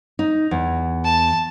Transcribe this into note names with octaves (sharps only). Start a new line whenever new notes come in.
D#4
E2
A5